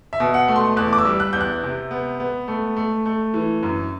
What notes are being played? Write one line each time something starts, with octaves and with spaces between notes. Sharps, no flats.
E5
B2
F#5
A3
C6
E2 F#6
D6
E6
G3
F#6
E2 G6
F#6
C3
B3
B3
A3
A3
A3
E3
F#2